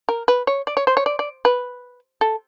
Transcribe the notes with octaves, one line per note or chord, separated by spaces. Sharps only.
A#4
B4
C#5
D5
C#5
C5
C#5
D5
D5
B4
A4